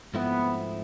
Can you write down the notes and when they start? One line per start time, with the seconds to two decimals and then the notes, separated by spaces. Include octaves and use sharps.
0.14 G#2 F3 A3 B3 C4 E4